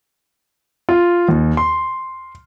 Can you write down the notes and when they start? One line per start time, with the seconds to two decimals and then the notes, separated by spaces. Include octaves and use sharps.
0.89 F4
1.28 D#2
1.57 C6